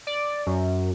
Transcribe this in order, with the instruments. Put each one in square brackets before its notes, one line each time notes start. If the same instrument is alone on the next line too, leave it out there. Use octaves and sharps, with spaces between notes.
[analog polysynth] D5
F#2